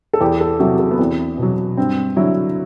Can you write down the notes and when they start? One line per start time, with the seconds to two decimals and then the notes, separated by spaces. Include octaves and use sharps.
0.13 A4
0.21 E2 G4
0.40 A4
0.60 C3 F#3 F#4
0.79 A4
0.91 B3
0.99 E2 C4
1.38 B2 F#3
1.77 G2 C4
2.16 D3 F#3 E4